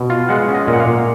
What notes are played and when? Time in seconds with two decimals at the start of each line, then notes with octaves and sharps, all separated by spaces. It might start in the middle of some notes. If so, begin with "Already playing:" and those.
Already playing: B2
0.10 F4
0.29 G#3 F#5
0.48 C#4
0.54 D#5
0.67 A#2
0.73 F#5
0.80 F5
0.87 A#2